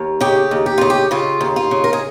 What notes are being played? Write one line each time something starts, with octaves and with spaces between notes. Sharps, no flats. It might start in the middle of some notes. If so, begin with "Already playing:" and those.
Already playing: D#2
C#3 G4
D#2
G4
C#3 F4
G4
C#3 F4
D#2
F4
C#3
A#4
G#4